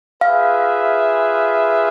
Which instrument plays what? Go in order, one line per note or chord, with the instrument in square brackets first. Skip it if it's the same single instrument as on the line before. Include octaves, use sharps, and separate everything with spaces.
[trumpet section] F4 G#4 B4 E5 [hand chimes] F5